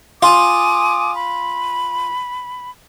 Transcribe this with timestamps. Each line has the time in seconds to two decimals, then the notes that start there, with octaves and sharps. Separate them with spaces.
0.23 F4 G#5 D6 D#6
1.14 B5